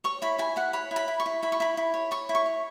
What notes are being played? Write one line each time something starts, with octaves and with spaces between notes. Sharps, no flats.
C#5 C#6
E4 B5
E4 G#5
E4 F#5
C#5 B5
E4
B5
E4
C#6
E4
E4 B5
C#6
E4 B5
E4
C#5
C#5 C#6
E4
C#6
C#5